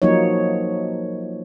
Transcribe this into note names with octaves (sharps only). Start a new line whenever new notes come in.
F3 F#3 A#3 D#4 C#5